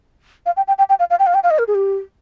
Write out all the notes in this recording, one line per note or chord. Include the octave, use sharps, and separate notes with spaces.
F5
G5
G5
G5
G5
F5
F5
G5
F5
G5
F5
D#5
A#4
G#4
G4